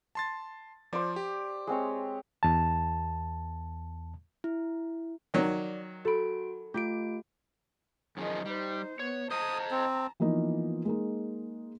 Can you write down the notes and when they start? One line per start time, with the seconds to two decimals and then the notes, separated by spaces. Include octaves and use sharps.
0.15 A5 C6 A6
0.93 F3 C5 D5
1.16 G4
1.67 G#3 C4 C#5
2.43 E2 A5
4.44 E4
5.34 D#3 F#3 D5
6.05 F#4 A4 B5 D7
6.74 A3 F4 G4 D7
8.17 F#2 D#3 F3 G#4 D#5
8.46 G3 D#4 C5
8.99 B3 C#5
9.31 C5 D#5 A5 A#5 D#6
9.71 C4
10.20 E3 F3 A#3 B3 D#4 F4
10.85 G#3 A#3 D#4